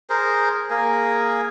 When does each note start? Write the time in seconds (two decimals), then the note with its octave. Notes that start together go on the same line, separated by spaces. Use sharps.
0.10 G#4 A#4 C5
0.70 A#3 G#4 A#4 G#5